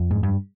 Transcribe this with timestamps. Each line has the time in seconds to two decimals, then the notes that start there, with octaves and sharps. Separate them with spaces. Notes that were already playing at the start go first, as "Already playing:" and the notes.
Already playing: F2
0.11 G#2
0.23 G2